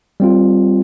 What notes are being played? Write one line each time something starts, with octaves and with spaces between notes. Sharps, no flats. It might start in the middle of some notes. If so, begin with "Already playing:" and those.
G3 C4 F4